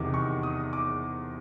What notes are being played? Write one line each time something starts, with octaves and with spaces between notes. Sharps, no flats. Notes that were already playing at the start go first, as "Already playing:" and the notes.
Already playing: E2 C3 D#3 D6
C#6
D#6
D6